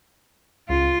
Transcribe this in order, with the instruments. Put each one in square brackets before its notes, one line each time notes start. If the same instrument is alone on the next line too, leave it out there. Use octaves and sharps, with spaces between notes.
[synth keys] C#2 [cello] F4